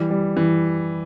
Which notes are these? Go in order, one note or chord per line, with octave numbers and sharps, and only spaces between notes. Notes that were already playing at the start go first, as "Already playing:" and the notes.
Already playing: E3 G3
G3
E3